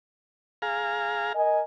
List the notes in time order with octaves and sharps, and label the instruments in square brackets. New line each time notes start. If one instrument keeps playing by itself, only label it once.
[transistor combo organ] G#4 F5 A#5
[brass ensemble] A#4 D#5 G#5